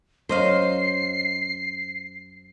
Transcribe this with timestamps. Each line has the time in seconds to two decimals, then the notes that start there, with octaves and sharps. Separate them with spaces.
0.29 F#2 C5 D#5 F5 C7